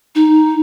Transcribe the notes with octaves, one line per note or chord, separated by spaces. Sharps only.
D#4